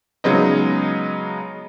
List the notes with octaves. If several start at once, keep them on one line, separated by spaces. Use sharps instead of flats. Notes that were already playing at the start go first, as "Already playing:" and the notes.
C#3 F#3 G#3 B3 D#4